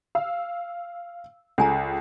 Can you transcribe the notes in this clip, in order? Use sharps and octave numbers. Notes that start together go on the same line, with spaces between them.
F5 E6
C#2 A4 G#5 A#5